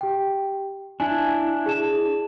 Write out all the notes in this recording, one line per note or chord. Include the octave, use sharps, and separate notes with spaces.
G4 G5
D4 E4 G#5
G#4 A5 E7